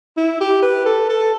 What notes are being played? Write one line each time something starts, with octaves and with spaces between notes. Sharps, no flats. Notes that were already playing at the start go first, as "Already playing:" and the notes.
E4
G4
B4
A4
A4